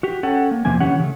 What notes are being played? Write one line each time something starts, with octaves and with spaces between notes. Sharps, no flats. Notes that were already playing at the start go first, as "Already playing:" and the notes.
F#4 G4
C#4 A4 F#5 G5
A#3
E2 C3 F3 A#3 G#5
D3 E3 C#4 G4 F#5
C#3 A3